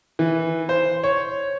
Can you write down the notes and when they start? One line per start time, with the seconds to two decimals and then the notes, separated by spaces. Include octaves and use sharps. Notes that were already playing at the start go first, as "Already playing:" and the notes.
0.19 E3
0.69 C5
1.04 C#5